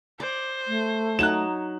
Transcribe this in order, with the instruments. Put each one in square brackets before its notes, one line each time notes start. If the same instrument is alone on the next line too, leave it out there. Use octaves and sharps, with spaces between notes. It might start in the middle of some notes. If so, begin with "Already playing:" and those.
[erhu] C5 [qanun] D5
[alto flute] A3
[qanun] F#3 D#4 [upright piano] F#6 E7